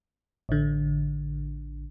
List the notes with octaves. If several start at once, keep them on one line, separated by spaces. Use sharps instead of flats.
A1 D3